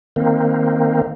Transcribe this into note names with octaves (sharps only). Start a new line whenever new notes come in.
D#3 A#3 C4